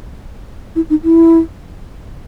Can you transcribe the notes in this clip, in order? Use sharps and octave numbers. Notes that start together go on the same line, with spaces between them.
E4
D#4
E4